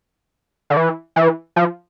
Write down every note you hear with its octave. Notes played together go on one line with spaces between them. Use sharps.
D3
E3
E3
F3